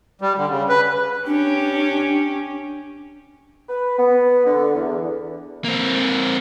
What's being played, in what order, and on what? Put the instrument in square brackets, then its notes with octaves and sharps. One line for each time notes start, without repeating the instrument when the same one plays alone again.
[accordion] G3
D3
C#3
B4
[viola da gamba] C#4 G4 [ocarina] D4
[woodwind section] B4
B3
D3
E2
[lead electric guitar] A#3 C4